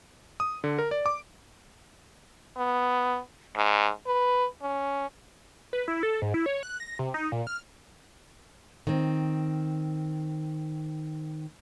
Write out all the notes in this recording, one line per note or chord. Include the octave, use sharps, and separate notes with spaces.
D#6
D3
A#4
D5
D6
B3
G#2
B4
C#4
B4
E4
A4
G#2
E4
C#5
F#6
A#6
C3
D#4
A#2
F6
D#3 C4